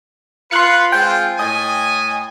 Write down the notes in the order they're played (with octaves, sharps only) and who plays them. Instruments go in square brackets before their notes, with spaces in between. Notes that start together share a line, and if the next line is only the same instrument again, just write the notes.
[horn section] F4 B4 [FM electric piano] C6 F#6 C#7
[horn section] G#3 C4 F4 [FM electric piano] G5
[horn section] A2 D#5 G#5